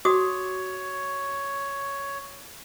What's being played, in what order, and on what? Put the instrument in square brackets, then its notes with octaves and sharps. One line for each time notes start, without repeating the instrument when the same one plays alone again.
[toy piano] F#4 D6 D#6 [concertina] C#5